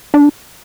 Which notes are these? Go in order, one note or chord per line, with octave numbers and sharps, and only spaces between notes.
D4